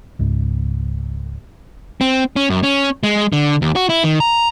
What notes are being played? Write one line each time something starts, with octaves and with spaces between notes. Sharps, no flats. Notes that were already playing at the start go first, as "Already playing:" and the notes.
C#2 G#2
C4
C#4
F#2
C#4
G#3
D3
D#2
F#4
E4
D#3
A#5